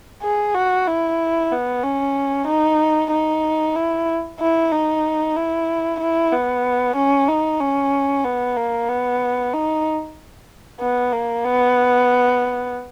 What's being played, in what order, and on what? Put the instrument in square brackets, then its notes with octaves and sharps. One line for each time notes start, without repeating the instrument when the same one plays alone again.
[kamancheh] G#4
F#4
E4
B3
C#4
D#4
D#4
E4
E4
D#4
E4
E4
B3
C#4
D#4
C#4
B3
A#3
B3
D#4
B3
A#3
B3